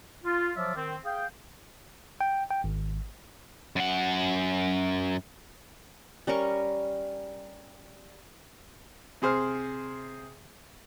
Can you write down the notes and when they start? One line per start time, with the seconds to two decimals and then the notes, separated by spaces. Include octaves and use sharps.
0.24 F4
0.56 F3 F#3 F4 D5 E5
0.75 D#3 C4
1.05 G#4 F5 G5
2.21 G5
2.50 G5
2.64 G#1
3.76 F#2 F#5
6.27 G3 C#4 A#4 C#6
9.22 C3 G#4 C5 F6